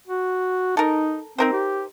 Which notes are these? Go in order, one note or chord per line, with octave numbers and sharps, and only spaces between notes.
F#4
D#4 A4 A#4
C4 D#4 A#4 C5
G4